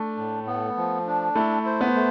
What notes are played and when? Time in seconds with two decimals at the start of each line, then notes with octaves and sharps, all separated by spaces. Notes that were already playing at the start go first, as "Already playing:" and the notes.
Already playing: A3 D4
0.17 A2
0.46 B3
0.77 F3
1.07 D4
1.35 A3 E4
1.66 C5
1.81 B3
1.95 A3